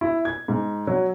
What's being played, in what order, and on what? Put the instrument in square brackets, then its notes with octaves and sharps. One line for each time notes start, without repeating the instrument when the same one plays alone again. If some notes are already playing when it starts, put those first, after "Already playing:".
[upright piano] E4
G#6
G#2
F#3